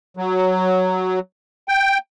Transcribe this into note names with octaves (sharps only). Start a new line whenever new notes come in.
F#3
G5